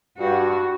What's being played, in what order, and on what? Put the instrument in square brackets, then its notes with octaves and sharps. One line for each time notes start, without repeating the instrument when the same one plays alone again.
[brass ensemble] G2 [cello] F#4